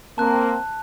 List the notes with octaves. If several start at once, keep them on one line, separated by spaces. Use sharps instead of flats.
A#3 C4 A5 F#6